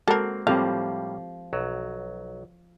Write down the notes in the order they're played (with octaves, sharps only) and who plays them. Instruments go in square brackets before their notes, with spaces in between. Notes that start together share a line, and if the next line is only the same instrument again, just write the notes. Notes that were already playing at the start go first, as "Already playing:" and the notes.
[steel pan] G#3 F#4 [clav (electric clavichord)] A#3 C4 [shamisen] A4 A#4
[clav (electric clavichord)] A2 G3 A#3 [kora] F3 [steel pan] C4 G4 A4 [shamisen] F5
[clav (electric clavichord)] B1 F#3